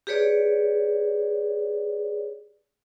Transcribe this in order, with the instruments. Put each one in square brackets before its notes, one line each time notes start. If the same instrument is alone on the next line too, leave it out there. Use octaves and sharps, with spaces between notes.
[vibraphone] G4 G#4 B4 C#5 D5